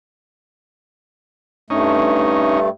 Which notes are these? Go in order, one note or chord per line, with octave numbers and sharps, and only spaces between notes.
G2 A3 C#4 D#4